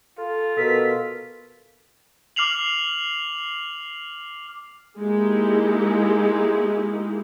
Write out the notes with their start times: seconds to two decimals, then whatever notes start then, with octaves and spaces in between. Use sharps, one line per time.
0.18 F4 A4
0.57 B2 A4 A#4 B6
2.36 D6 F6 C7 F7 F#7
4.99 G#3 A#3 D#4 E4 G4